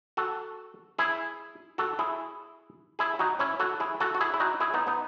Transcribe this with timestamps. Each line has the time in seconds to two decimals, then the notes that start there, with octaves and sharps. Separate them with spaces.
0.17 F#4 A4
0.99 E4 G#4
1.78 F#4 A4
1.99 E4 G#4
2.99 E4 G#4
3.19 D#4 F#4
3.39 C#4 E4
3.60 F#4 A4
3.80 E4 G#4
4.00 F#4 A4
4.15 F#4
4.20 E4 G#4
4.34 E4
4.40 D#4 F#4
4.60 E4 G#4
4.74 B3 D#4
4.87 B3 D#4